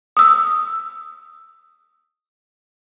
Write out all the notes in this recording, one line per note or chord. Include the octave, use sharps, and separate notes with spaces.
D#6 E6